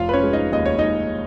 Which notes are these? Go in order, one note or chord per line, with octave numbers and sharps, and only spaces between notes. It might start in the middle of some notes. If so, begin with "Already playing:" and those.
Already playing: F1 F4 F5
B4
C#4 C#5
G#3
D#4 D#5
D#2 D#5
C#5
G#3 D#4 D#5